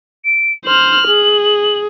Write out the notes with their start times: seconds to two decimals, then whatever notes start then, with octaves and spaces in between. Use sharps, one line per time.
0.24 D7
0.65 C5 F6 F#7
1.08 G#4